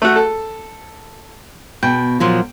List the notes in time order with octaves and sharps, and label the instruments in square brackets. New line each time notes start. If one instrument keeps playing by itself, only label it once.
[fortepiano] A3 F#4
A4
[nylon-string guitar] B2 [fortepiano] G5
[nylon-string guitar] A#2 F3 F#3